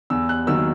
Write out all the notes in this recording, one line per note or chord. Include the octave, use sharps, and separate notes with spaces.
E2 E6
F#6
D#3 F#3 A#3 E6